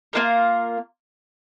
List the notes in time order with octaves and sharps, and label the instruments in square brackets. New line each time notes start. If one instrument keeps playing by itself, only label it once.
[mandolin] A#3 D4 F4 A#4